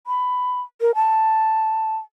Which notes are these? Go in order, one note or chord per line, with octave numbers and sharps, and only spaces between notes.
B5
A#4
A5